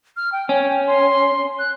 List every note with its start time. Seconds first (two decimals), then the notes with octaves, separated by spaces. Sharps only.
0.17 F6
0.32 G5
0.49 C#4 G5
0.87 C6
1.59 F#6